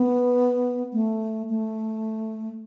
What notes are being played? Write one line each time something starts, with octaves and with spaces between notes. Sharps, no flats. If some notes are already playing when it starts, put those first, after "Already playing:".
Already playing: B3
A3
A3